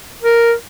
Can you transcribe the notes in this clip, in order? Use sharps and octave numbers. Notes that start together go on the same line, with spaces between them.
A#4